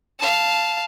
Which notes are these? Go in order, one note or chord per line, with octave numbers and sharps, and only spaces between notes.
F5 A5